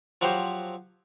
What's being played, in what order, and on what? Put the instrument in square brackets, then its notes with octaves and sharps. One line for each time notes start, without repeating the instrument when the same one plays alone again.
[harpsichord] F3 F#3 F#4 G4 C5